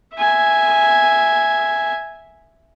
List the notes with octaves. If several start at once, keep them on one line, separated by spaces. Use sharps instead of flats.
E5 G#5